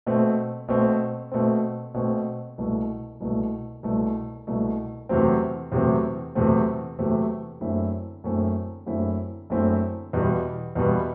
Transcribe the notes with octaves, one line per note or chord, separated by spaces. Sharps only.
B2 A3 C4
B2 A3 C4
B2 A3 C4
B2 A3 C4
C2 B2 A3
C2 B2 A3
C2 B2 A3
C2 B2 A3
E2 C3 F#3 A3 C4
E2 C3 F#3 A3 C4
E2 C3 F#3 A3 C4
E2 C3 F#3 A3 C4
F#2 D3 A3 C4 E4
F#2 D3 A3 C4 E4
F#2 D3 A3 C4 E4
F#2 D3 A3 C4 E4
E2 B2 G3 B3
E2 B2 G3 B3